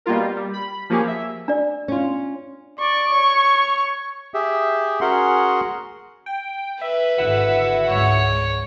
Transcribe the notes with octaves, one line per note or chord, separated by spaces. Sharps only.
B2 G3 A#3 B3 F4 A#4
G3
G3
B5
F3 A#3 C#4 G4 G#4
E5
D4 D5
C#4 F4
D5 C#6
C#5
G4 G#4 E5
C#4 F#4 G#4 A#4 F#5 C6
G5
B4 E5
G#1 D3 E4 F#4 E5 F#5
C#2 G#2 C#5